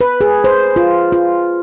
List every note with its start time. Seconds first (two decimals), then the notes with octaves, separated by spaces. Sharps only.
0.01 B4
0.21 G#4
0.44 C5
0.76 F4
1.12 F4